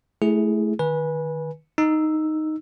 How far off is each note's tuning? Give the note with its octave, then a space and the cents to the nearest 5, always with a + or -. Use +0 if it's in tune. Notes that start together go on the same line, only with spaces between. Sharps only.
A3 -20 E4 +0 G#4 +0
D#3 -25 B4 -25 G#5 +0
D#4 +0 E6 +0